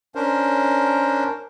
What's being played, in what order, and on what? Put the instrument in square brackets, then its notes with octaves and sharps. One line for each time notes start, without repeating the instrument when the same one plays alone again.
[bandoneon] C#4 D4 A#4 C5